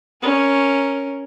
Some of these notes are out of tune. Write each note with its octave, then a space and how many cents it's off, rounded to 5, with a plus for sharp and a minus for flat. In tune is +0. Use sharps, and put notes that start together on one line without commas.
C#4 +0 A#4 +0